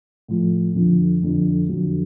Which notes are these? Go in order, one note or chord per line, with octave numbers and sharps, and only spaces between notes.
A2 F3
F2 D3 F3
F2 D3 F3
F2 D3 F#3